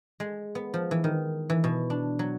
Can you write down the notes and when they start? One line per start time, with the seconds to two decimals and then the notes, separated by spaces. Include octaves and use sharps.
0.20 G#3
0.55 B3
0.74 F3
0.91 E3
1.04 D#3
1.50 E3
1.64 B2
1.90 D4
2.19 F#3